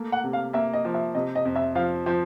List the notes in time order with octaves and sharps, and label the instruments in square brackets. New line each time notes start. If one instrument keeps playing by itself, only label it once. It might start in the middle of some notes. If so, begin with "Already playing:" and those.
Already playing: [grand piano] A3 A#3
[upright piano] F#5
[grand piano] C3
[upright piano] F5
[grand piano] A#3 [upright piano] E5
[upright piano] D#5
[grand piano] F3
[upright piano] E5
[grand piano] C3 [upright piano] D#5
[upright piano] D#5
[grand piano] F2
[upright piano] E5
[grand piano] F3 [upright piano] F5
[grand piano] F3 [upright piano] C5